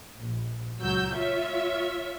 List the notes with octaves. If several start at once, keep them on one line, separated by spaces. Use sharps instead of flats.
A#1
C#2 F#3 E6 G6
F4 C#5 E5